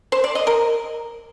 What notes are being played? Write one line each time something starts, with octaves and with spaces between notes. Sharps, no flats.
C5
D5
D#5
A#4